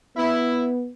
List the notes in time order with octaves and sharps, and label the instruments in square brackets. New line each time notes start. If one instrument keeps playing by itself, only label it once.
[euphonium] B3 [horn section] E4